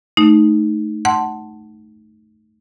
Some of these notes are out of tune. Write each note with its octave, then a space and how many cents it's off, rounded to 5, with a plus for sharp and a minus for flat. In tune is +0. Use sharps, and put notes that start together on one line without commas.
A3 -10 D#4 +0
F#5 +20 A5 +0 C6 +0